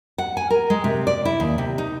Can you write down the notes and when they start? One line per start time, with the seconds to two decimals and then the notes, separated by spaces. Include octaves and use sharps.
0.18 F#5
0.37 G#5
0.50 A#4
0.70 G#3
0.84 C3
1.07 D5
1.25 E4
1.40 D#2
1.58 C3
1.78 D#4